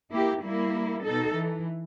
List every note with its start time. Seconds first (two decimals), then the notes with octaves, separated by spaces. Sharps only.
0.11 A#3 E4 G4
0.43 G3 A#3 E4
1.04 B2 D#4 A4
1.33 E3